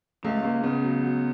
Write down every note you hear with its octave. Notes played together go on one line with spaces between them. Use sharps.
C#2 A3
C#2 A#3
C#3 B3
F#3
F#3